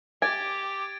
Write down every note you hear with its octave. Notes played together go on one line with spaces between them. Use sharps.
G4 G#5 D6 G#6 A6 D7